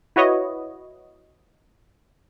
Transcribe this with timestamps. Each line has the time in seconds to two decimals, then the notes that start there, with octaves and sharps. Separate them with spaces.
0.16 E4 F#4 B4 C#5 D#5